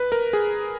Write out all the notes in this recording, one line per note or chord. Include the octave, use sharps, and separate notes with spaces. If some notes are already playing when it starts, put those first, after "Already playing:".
Already playing: B4
A#4
G#4